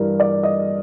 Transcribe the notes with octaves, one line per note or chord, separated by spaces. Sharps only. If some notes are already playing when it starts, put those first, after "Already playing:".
Already playing: G2 E3 G3 A#4
D5
D#5